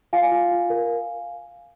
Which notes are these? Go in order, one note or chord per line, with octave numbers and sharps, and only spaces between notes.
F4 F5 G#5
F4
F4
A#4